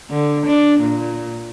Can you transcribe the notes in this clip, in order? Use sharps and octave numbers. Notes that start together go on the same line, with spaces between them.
D3
D4
A#2